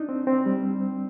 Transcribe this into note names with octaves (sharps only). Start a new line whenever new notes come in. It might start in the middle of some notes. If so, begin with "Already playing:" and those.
Already playing: D4 D#4
C4
C4
G3